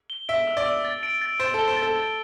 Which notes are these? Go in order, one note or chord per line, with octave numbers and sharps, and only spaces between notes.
G7
E5 D7
E6
D5
E6
A6
D7
A6
C5 A6
A4
G7
C5
A6
A4
A6